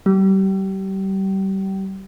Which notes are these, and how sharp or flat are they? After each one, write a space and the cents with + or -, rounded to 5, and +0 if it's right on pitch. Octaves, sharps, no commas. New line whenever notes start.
G3 -30